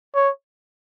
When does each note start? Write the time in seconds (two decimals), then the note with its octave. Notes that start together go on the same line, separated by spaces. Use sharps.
0.15 C#5